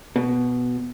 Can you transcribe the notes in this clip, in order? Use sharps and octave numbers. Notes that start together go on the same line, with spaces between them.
B2